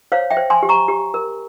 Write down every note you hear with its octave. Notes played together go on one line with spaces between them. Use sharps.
C5 C#5 F5
E5 G5
C5
G#5 C6
G4
A#5 C#6
G4
A#4